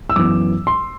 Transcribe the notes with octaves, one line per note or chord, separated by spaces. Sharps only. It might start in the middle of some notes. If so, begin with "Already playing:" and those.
E6
F#2 E3 B3 D6
C6